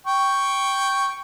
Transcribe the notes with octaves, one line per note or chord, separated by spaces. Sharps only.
G5 C#6